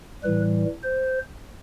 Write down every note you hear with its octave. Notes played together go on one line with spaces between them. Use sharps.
A2 E3 G3 B4
C5